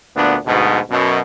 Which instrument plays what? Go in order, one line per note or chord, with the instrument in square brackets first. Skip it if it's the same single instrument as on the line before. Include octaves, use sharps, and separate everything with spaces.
[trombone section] D2 A#2 B3 D4
D2 G#2 B2
F#2 B2